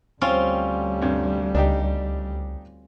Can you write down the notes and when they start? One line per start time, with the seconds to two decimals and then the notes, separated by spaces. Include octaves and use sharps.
0.21 D2 G3 C4 C#4 F4
1.01 G2 C3
1.55 C#2 D4 D#4 G4